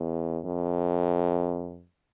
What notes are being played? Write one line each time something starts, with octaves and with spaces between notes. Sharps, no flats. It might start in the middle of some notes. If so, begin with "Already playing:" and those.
Already playing: E2
F2